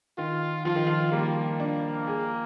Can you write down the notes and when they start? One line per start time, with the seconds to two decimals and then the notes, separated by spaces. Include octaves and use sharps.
0.18 D#3 F4
0.65 F3 F4
0.75 D#3
0.86 F3
1.12 G3 A#3
1.60 D4
2.07 G#4